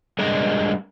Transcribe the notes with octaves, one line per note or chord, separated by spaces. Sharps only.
G3 G#3 D4 A#4 D#5